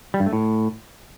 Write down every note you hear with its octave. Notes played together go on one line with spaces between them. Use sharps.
G3
G2
A3
A2